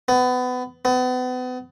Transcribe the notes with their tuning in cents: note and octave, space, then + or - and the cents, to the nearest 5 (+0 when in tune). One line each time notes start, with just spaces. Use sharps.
B3 +25
B3 +35